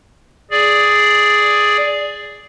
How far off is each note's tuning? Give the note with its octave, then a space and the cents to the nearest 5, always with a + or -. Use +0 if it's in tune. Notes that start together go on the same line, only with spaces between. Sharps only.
G#4 +0 D5 +0